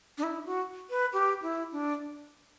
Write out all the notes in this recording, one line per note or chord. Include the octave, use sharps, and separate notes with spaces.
D4
E4
F#4
B4
G4
E4
D4